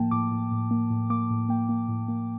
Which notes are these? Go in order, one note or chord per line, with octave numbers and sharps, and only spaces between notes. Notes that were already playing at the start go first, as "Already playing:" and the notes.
Already playing: A2 F3 A#3 G5 A5
A2 D6
A2
A2
A#3
A2
A#3 D6
A2
A#3 G5
A#3
A2
A#3